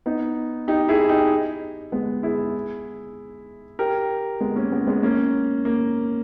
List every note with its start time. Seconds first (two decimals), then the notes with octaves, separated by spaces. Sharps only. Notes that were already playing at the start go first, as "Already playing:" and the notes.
0.06 B3 D#4
0.68 D#4 G4
0.88 E4 G#4
1.09 D#4 G4
1.92 G#3 B3
2.23 E4 G#4
3.79 G4 A#4
4.41 G#3 B3
4.56 A#3 C#4
4.72 G#3 B3
4.87 G#3 B3
5.03 A#3 C#4
5.65 A#3